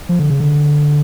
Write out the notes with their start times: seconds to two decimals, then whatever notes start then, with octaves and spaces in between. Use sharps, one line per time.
0.09 F3
0.19 D3
0.30 C#3
0.40 D3